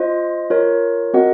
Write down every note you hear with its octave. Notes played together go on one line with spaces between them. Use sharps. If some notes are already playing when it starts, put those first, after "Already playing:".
Already playing: F4 C5 D#5
F4 A#4 C#5
C4 F#4 A#4 D#5 F#5